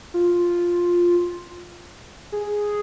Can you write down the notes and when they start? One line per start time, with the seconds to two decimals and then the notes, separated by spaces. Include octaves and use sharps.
0.14 F4
2.32 G#4